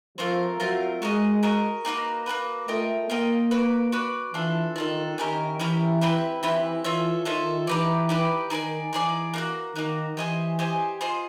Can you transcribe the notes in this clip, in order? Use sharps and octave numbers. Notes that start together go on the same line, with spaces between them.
F3 A3 C4 F4 A#4
F#3 A3 C4 F4 A#4
G#3 F#4 A#4 D#5
F#4 A#4 D#5
A#3 D#4 F#4 B4
A#3 D#4 F#4 B4
A3 F4 A#4 D#5 G5
A#3 F4 A#4 D#5 G5
F#4 B4 D5
F#4 B4 D5
E3 D4 F4 A4
D#3 D4 F4 A4
D#3 C#4 E4 G4 A#4
E3 C#4 E4 G4 A#4
C4 E4 G4 B4
E3 C4 E4 G4 B4
E3 F4 A4 C#5 E5
D#3 F4 A4 C#5 E5
E3 D#4 G4 B4 D5
D#4 G4 B4 D5
D#3 D#4 G#4 B4 D5
E3 D#4 G#4 B4 D5
A#3 D#4 F#4
D#3 A#3 D#4 F#4
E3 G4 C5 D#5 G#5
G4 C5 D#5 G#5
F4 G#4 C5 D#5